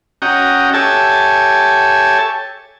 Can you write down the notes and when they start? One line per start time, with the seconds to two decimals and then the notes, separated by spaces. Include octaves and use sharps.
0.22 C#4 F#4 D#5 G5 A#5
0.74 G4 A4 C#5 E5 G#5 A5